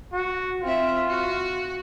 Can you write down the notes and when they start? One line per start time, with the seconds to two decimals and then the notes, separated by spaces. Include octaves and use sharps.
0.13 F#4
0.62 C4 F4 E5
1.08 F#4